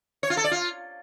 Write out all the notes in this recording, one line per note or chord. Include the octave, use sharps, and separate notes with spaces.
C#5
F4
A4
D5
F4